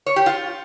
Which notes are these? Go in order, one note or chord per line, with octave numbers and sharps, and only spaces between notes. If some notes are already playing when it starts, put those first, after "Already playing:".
C#5
G4
F4